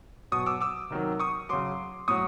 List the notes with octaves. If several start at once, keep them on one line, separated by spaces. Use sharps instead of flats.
B2 F#3 C#6 D#6
D6 E6
D6 E6
C3 D#3 F#3
C#6 D#6
C#3 F#3 C6 D6
A2 F#3 C#6 D#6